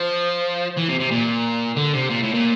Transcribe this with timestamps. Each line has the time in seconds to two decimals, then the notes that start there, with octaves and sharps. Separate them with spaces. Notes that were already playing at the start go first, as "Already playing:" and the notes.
Already playing: F3
0.77 E3
0.89 C3
1.00 C3
1.11 A#2
1.77 D3
1.93 C3
2.10 A#2
2.23 A2
2.34 A#2